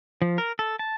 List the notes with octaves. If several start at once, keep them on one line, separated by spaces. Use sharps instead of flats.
F3
A#4
A4
A5